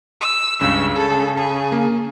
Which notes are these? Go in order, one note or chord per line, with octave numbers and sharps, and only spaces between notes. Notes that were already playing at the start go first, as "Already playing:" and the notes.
E6
C#2 G2 C#3 E6
G#4 A4
G#4 A5
A#3